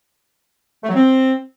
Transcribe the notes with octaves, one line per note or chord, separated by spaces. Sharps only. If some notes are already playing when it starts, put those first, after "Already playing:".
A3
F#3
C4